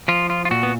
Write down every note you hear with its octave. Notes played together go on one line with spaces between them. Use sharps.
F3 F4
F4
F4
A#2 F#4
B3